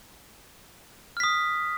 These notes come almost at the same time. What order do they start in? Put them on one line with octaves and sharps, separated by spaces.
F6 B6 D#6